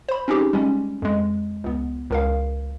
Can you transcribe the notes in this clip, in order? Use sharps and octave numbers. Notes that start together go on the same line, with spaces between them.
C5 B5
C4 C#4 D#4 G4 G#4
G3 G#3 C#4
F2 G#3
C#2 B3
C#2 A#4 F5